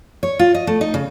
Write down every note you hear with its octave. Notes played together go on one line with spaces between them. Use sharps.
C#5
F4
D#5
A3
D#4
C#3